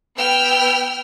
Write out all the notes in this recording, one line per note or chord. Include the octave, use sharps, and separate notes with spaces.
B3 G5 E6 F6